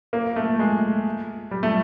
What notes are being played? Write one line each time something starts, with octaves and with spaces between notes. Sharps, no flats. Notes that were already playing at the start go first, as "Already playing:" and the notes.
A#3
A3
G#3
G3
A3